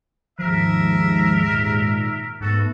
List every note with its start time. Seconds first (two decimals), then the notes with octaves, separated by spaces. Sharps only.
0.39 D#2 G#2 F3 A#4 E5
1.49 A#2
2.40 G#2 A3 B3 F#4 A4